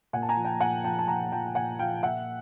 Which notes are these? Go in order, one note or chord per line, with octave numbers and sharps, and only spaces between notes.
A#2 F#5 G#5
A5
G#5 A#5
F3
G5 A5
A#2 F#5 G#5
F3 G5 A5
A5
A#2 G#5 A#5
F3 G5 A5
A#2 F#5 G#5
F3 F5 G5
A#2 E5 F#5